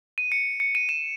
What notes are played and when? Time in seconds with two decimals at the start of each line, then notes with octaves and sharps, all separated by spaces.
0.18 D#7
0.32 C#7
0.60 C#7
0.75 D#7
0.89 E7